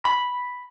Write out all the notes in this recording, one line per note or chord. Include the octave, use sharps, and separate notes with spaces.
B5